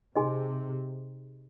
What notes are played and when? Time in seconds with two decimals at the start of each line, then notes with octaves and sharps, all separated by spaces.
0.15 C3 D#4 G#4 D#5 G#5 C6